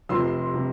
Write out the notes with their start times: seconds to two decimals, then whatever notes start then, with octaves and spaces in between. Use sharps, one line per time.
0.09 F1 F2 C3 C6 E6
0.54 C3